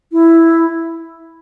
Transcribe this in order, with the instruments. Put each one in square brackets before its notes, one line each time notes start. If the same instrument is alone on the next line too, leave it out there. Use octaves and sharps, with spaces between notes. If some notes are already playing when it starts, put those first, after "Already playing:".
[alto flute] E4